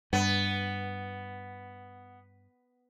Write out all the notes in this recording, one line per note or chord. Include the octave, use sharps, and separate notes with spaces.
G2 B3